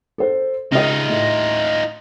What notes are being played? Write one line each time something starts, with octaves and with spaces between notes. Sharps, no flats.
A4 C5
C#2 D#4 F4 D#5
A2